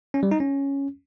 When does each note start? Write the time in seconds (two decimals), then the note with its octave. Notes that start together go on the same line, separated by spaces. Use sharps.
0.14 C#4
0.23 G3
0.31 D#4
0.40 C#4